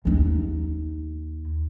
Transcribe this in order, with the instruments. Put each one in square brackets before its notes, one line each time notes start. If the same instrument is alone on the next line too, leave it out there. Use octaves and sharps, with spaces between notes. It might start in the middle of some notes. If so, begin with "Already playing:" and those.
[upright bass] D#2 D#4